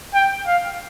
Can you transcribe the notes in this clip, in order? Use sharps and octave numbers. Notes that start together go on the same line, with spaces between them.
G5
F5